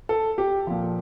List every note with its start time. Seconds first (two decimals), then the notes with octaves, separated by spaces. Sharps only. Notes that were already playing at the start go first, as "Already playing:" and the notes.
0.09 A4
0.38 G4
0.67 A#2 F3